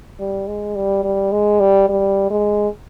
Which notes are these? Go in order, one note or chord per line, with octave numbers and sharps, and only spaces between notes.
G3
G#3
G3
G3
G#3
G3
G3
G#3